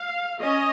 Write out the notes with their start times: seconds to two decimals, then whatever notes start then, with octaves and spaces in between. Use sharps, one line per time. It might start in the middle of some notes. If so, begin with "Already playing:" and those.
Already playing: F5
0.42 C#4 D#5